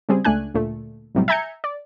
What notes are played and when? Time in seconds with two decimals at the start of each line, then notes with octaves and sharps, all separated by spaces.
0.09 C#3 G3 C4 G#4
0.25 C#2 A3 D4 G#5 F#6
0.54 D2 A#2 A3
1.15 B1 A2 C3 F#3 G3
1.28 E5 G#5 A#5 G6 G#6 C#7
1.64 D5